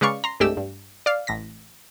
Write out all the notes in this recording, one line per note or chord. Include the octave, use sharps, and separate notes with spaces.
C#3 G#3 B4 D5 F5 C#6
A#5 C6
C2 G2 G#3 A3 G4 E6
G2
D5 F5
A1 A#6 B6